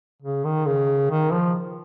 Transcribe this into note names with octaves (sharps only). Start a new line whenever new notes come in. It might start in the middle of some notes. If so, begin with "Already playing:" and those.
C#3
D#3
C#3
D#3
F3